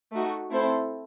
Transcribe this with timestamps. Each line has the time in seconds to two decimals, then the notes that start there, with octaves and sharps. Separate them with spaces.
0.12 A3 D#4 F#4
0.50 A3 C4 E4 A4 C5